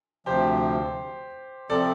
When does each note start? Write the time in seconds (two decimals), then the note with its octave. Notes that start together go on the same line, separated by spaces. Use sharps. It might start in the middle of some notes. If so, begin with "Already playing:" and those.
0.26 D2 C3 F3 G4 C5
1.70 C3 F3 C4 A4 D5